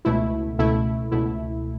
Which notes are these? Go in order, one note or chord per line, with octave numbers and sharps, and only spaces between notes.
C#2 B2 A3 E4
C#2 B2 A3 E4
C#2 B2 A3 E4